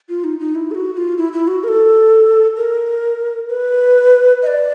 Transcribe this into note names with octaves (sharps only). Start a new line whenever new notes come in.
F4
D#4
D#4
E4
A4
F#4
F#4
F4
E4
E4
F#4
A#4
A4
A#4
B4
D#5
D5